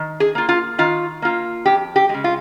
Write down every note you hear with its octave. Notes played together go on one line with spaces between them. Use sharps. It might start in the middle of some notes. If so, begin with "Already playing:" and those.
Already playing: D#3
G#4
A#3 F4
F4
D#3 F4
A#3 F4
F2 G4
G4
G#3
C#3
F4